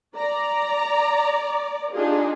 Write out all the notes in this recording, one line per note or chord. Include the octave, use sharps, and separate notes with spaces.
D5 A#5
D4 D#4 F4 G4 G#4